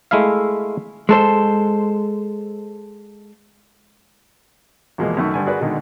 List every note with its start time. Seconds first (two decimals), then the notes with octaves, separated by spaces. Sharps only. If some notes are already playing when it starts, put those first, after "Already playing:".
0.11 G#3 A3 E4 E5 F5
1.09 G#3 A4 C5
4.98 E2 B2 F3 G#3 A#3
5.17 F#2 D#3 A3 D#4 C#6
5.34 G2 D3 G#5
5.46 F#4 G#4 A#4 B4 D5 F#6
5.61 B2 D3 D#3 G#3